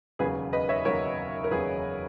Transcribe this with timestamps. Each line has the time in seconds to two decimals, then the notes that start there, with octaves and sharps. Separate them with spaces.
0.19 E1 D#2 C#3 F#3 G#4 B4
0.53 B4 D#5
0.69 C#5 E5
0.85 E1 D#2 C#3 F#3 A#4 C#5
1.44 A#4
1.51 E1 D#2 C#3 F#3 G#4 B4